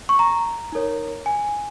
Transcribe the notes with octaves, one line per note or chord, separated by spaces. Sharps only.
C#6
A#5
D#4 A#4 C#5
G#5